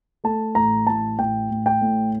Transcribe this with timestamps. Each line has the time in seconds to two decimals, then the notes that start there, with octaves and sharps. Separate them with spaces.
0.24 A3 A5
0.55 A1 A#5
0.87 A1 A5
1.19 A1 G5
1.50 A1
1.66 G5
1.81 A2